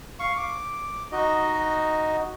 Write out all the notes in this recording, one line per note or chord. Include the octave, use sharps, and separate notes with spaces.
F5 C#6
D6
D#4 F#4 D#5